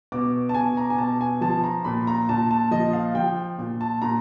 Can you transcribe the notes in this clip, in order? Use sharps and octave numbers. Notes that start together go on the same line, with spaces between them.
B2 D6
A5
B2 G#5
A#5
G#5
B2 A5
G#5
F3 A5
A#5
A#2 B5
A#5
A#2 A5
A5
F3 D#5
F5
F3 G5
A#2
A5
A#2 A#5